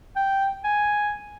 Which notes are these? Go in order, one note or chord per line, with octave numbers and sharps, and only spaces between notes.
G5
G#5